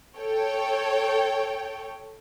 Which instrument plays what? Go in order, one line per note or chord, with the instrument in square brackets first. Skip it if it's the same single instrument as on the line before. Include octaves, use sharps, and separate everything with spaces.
[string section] A4 C#5 G5